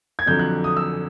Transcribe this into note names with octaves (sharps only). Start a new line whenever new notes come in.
G#6
F2 D3 F#3 G6
F#6
D#6
E6